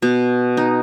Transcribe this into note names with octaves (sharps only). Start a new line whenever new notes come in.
B2
D#4